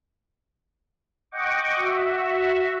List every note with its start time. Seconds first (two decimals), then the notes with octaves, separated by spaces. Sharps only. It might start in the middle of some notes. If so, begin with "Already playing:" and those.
1.31 D#5 F#5 G5 C#6 D6
1.76 F#4 E5